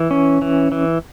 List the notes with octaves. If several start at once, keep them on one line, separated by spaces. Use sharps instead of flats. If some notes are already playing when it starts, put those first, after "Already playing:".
Already playing: E3
C#4
E3
E3